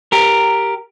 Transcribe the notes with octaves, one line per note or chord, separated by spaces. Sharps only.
G4 A#4